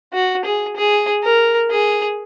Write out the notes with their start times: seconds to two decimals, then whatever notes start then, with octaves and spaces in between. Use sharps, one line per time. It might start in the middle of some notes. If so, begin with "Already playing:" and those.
0.14 F#4
0.45 G#4
0.76 G#4
1.23 A#4
1.71 G#4